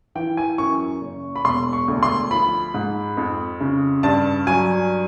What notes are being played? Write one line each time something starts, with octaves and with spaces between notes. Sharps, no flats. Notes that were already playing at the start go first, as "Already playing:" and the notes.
E3 G5
G#5
F#2 C#6
F#1
B5
E1 C6
C#6
D2
C6
F3 B5
G#2
F2
C#3
G2 A5
F#3 G#5